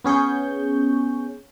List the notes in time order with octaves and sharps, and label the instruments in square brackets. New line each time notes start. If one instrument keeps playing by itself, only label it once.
[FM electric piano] B3 C#4 G#4 C#6 G6